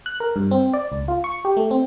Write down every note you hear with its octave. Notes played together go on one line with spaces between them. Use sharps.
F#6
A#4
G2
C4
D5
C#2
F4
C#6
G4
A3
C4